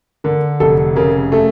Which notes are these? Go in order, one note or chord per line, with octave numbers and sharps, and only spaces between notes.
D3 A#4
F1 A4
C#3 A#4
A3 A4